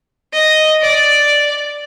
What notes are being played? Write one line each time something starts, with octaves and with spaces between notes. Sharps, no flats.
D#5
D5